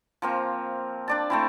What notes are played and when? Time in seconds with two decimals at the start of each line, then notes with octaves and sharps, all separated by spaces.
0.22 F3 A#3 C4
1.08 D4 D5 A5
1.30 A3 C4 E4